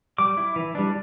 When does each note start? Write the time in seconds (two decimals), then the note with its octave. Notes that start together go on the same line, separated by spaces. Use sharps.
0.18 G3 D6
0.37 E4
0.56 E3
0.75 G3 D4